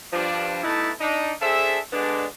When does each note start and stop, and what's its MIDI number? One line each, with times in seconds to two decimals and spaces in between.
0.12 0.61 43
0.12 0.61 53
0.12 0.61 62
0.64 0.91 47
0.64 0.91 57
0.64 0.91 63
0.64 0.91 64
0.64 0.91 71
0.64 0.91 81
1.00 1.32 62
1.00 1.32 63
1.41 1.78 62
1.41 1.78 68
1.41 1.78 69
1.41 1.78 72
1.41 1.78 76
1.92 2.25 50
1.92 2.25 56
1.92 2.25 59
1.92 2.25 62